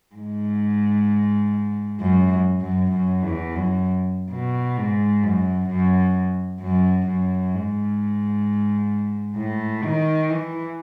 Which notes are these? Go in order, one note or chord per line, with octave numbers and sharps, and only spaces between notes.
G#2
F#2
F#2
F#2
E2
F#2
B2
G#2
F#2
F#2
F#2
F#2
G#2
A2
D#3
E3